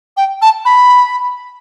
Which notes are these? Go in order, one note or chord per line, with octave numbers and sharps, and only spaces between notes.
G5
A5
B5